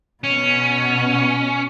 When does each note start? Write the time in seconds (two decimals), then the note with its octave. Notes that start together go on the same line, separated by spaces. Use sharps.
0.24 B2 C#4